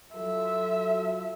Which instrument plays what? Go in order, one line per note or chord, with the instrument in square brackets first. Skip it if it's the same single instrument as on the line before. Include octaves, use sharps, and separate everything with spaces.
[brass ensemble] F#3 F4 A4 [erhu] E5